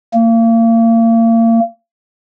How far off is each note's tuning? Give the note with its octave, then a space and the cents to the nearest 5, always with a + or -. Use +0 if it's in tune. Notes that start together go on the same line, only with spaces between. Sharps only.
A#3 -35